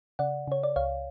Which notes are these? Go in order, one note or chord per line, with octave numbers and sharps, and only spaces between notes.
C#3 D5 F#5
C#3 C#5
D5
C#2 C#5 F5